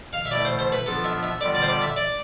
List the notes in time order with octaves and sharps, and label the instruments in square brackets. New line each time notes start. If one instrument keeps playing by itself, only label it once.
[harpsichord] F5
E5
[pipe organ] B2 A3 E4 A4 [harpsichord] D5
[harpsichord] C5
C5
B4
[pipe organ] F3 B3 D4 F4 [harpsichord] A4
[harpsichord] E5
E5
[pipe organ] D3 G3 B3 F4 A4 [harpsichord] D5
[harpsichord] D5
C5
D5
E5
D5